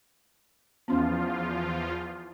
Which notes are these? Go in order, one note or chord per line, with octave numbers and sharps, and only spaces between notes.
E2 F3 B3 C#4 F4